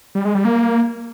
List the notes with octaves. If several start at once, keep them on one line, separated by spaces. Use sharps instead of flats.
G3
G#3
G3
A#3